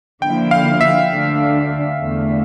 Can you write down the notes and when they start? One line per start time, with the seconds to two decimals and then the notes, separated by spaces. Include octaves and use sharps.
0.22 D3 F3 A#3 E4 G5
0.51 F5
0.81 E5
1.11 D2 D3 A3 D4
1.99 E2 D3 A3